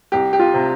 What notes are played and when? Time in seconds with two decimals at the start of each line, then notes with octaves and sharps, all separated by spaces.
0.12 C2 G4
0.33 G4
0.39 F4
0.54 C3